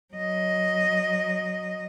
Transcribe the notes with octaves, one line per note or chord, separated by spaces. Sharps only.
F#3 D#5